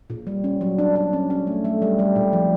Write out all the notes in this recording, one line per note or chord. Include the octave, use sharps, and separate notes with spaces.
A#2
G3
C#4
F#3
D4
D4
C#4
C#4
A3
A3
G3
G3
A#2
F3